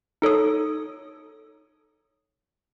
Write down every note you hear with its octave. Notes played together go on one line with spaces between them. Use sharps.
D#4 A4 C#5 D#6